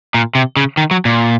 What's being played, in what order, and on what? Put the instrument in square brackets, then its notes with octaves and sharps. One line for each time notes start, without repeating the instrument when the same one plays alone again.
[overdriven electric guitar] A#2
C3
C#3
D#3
F#3
A#2